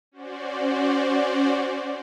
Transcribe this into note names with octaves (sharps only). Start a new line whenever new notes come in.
C#4 F#4 C5 D5